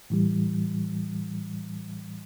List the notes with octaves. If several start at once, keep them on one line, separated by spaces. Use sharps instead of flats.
A2 E3 G3